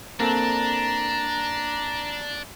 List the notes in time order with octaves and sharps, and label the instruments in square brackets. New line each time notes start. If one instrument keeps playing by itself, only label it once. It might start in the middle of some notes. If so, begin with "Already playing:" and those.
[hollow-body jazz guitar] A#3 C4 A4 [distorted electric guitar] D4 [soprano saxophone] A#5